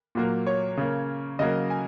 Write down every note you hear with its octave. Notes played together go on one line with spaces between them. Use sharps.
A#2 F#3 A#3
C#5
C#3 A#3
C#3 F#3 A#3 D#5
G#5